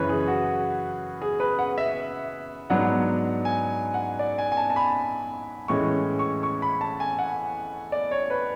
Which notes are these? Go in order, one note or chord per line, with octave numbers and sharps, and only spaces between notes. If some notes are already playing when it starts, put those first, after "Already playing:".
Already playing: F#2 C#3 E3 B4 C#5
G#4
F#4
G#4
B4
F#5
E5
G#2 F#3 B3 D4 F#5
G#5
F#5
D5
G#5
G#5
A5
A5
B5
A2 E3 G#3 C#4 C#6
C#6
C#6
B5
A5
G#5
F#5
D5
C#5
B4